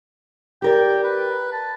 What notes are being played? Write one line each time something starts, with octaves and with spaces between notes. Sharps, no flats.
G4 A#4 D5 G5
B4
A5